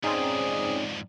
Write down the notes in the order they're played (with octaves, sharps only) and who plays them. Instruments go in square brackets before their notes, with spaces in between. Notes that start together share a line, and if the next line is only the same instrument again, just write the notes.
[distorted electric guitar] F2 G#2 [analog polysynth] C4 C#4 D#4 [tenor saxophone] G#4 [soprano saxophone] D5